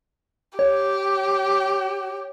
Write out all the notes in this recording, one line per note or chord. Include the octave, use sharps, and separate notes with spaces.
G4 C#5